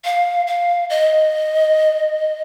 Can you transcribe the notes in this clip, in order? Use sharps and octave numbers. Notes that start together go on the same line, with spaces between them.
F5
F5
D#5